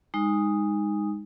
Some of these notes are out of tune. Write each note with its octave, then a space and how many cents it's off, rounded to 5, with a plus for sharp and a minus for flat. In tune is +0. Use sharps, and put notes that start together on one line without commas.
G#3 -25 D#4 +0 D#6 +0